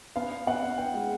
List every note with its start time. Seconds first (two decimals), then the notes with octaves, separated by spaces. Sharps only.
0.16 B3 F5
0.31 B3
0.47 B3 F#5
0.62 B3
0.78 B3 G5
0.94 G#3